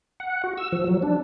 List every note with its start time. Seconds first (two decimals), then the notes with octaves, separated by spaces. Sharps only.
0.20 F#5
0.44 F#4
0.58 E6
0.72 F3
0.87 F#3
1.03 D4